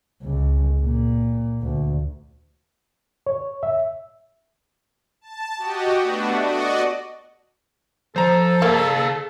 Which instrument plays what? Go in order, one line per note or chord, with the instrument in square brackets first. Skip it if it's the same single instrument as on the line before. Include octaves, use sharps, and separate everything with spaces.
[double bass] C#2
A#2
D2
[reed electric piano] C#5
E5
[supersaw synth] A5
F#4 G4 D#5
A3 B3 D4 F#4
F#4 D5 D#5
[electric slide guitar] F3 [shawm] A4 [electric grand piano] C5 A#5
[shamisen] A#3 [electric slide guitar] G#4 F5 A5